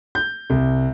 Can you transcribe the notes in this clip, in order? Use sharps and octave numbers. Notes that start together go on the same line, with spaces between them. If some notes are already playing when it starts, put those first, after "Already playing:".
G6
C2